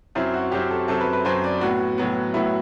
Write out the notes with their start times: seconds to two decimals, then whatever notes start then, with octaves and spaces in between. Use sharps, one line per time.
0.15 F#2 F#3 C4 E4
0.34 F#4
0.52 F#2 F#3 C4 G4
0.71 A4
0.88 F#2 F#3 C4 A4
1.01 B4
1.13 B4
1.24 F#2 F#3 C4 C5
1.44 D5
1.61 A2 F#3 B3 F#4
1.98 A2 F#3 B3
2.34 A2 F#3 B3 E4